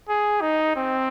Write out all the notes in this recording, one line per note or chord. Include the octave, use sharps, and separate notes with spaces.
G#4
D#4
C4